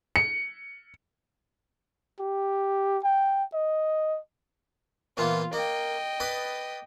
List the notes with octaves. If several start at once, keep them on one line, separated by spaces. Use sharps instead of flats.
C#7
G4
G5
D#5
A#2 E3 B3 F4
A#3 D#5 G5
B4 D5 D#6